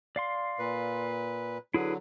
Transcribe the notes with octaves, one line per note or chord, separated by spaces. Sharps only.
D5 F5 C6
A#2 B4
D3 F#3 E4 G#4 B4